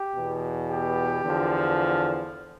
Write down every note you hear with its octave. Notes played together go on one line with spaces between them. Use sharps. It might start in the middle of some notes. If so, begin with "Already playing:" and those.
Already playing: G4
E2 B2
G4
E2 D3 F3